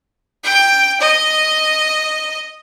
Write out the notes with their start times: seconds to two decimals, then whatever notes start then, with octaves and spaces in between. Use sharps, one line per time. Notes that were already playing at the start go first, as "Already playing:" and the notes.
0.44 G5
1.00 D#5